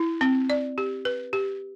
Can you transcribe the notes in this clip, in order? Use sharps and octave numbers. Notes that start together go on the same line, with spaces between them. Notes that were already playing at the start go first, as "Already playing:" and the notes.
Already playing: E4
C4
D5
G4
B4
G4